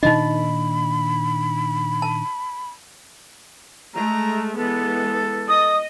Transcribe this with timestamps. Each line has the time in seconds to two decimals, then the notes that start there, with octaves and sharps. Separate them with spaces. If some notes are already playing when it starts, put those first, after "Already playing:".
0.03 A#2 D#3 D4 D#4 D#5 B5
2.02 A5
3.94 G#3 A3 A#5
4.56 E3 G#3 B3 A4
5.48 D#5 D#6